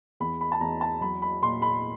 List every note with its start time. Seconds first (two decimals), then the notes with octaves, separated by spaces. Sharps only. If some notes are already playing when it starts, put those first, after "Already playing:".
0.20 E2 B5
0.41 B5
0.52 A5
0.60 E2 A#5
0.81 A5
1.01 F#3 B5
1.22 B5
1.42 A#2 C6
1.62 B5